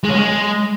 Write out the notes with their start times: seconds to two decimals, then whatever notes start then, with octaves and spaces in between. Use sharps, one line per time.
0.03 G#3
0.09 C#4
0.14 G#3